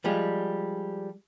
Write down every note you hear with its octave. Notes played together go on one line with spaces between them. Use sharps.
F3 G3 G#3 F4